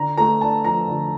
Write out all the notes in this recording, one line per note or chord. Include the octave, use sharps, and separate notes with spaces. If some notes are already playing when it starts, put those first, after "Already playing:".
Already playing: D3 A#5
A3 A#5
D4 A5
F3 A#5
D3